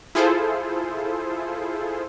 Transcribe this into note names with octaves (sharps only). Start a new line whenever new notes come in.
E4 F4 G#4 A4 C5